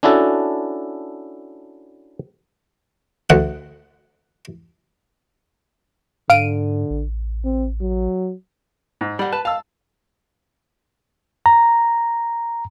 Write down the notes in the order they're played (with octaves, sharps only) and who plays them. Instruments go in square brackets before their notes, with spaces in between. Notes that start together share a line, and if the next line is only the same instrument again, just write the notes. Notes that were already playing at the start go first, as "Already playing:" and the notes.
[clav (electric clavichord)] C#4 D4 E4 F#4 A4
[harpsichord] D2 F#5
[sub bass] G#2 [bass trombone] D3 [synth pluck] F5 D7 D#7
[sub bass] A1
[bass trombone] C4
F#3
[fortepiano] G#2
[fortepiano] G3 [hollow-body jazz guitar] D5 F#5
[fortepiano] B4 [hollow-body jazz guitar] A5
[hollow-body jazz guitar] F5 [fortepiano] A5 E6
[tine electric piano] A#5